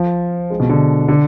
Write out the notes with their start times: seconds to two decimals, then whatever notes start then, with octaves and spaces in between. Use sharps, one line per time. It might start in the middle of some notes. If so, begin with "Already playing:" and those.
Already playing: F3
0.50 G#3
0.60 B2
0.69 D3
1.08 D3